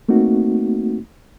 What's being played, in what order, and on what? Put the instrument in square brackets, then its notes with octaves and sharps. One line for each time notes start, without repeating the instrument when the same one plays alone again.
[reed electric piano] A3 A#3 C4 D#4 F#4